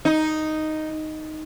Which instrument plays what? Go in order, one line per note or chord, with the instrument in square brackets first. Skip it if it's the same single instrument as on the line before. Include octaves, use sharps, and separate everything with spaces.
[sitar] D#4